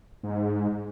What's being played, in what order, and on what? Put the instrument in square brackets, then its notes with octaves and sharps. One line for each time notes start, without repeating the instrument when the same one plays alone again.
[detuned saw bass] G#2